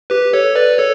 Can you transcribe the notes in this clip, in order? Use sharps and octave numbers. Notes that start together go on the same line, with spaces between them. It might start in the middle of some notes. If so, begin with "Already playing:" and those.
G4 B4
A4 C#5
B4 D5
A4 C#5